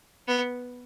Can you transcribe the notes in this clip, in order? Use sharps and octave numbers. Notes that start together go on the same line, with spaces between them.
B3